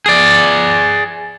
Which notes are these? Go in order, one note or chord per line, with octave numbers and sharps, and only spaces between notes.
G#4 D5